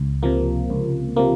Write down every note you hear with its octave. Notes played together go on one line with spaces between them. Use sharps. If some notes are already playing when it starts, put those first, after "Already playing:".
Already playing: C#2
C3 F3 A#3
C#2
C3 F3 A#3